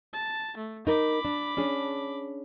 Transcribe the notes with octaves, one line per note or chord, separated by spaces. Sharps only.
A5
A3
D#4 A#4 B5 D6
D4
C#4 D4 G#4